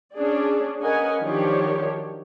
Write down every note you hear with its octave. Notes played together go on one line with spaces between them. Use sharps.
C#4 D4 G#4 D5
C#4 A#4 B4 D#5 F#5 G#5
D#3 F3 F#3 D4 G4 C#5